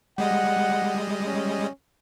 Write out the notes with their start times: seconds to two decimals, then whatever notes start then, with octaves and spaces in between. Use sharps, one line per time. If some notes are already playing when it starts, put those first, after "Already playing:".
0.18 G3 G#3 D#5 F#5
1.26 C#4